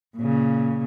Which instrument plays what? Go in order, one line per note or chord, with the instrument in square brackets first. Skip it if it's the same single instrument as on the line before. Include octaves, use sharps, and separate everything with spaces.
[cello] A#2 C#3